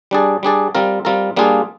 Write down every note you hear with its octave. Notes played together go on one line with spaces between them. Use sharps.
G3 D4 G#4 D5
G3 D4 G#4 D5
G3 C4 F4 A#4
G3 C4 F4 A#4
G3 A#3 D4 F4 G#4